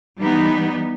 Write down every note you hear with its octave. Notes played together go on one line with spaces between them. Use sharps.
E3 G3 B3 D#4